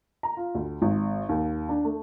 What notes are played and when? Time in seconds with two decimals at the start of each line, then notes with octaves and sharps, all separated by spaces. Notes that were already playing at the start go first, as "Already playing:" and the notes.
0.23 A#5
0.37 F4
0.55 D2
0.82 G#1
1.29 D#2
1.69 D4
1.85 A3